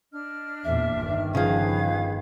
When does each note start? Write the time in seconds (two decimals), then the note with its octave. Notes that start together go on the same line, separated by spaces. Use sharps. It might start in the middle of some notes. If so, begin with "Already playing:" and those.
0.12 D4 D#5 F6
0.64 E2 A#2 E5
0.97 G1 D#3
1.35 C#3 F3 G#4 B4 F5 G#6